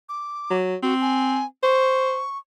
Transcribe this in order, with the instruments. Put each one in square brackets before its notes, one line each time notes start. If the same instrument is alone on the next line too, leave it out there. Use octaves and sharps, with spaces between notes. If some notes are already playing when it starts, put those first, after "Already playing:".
[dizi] D6
[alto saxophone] F#3
[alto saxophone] C4 [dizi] F#4
[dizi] G#5
[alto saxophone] C5 [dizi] C#6